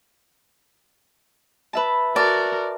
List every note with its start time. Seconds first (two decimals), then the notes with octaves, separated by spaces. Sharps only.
1.73 B4 E5 A5
2.16 F#4 A#4 D5 A5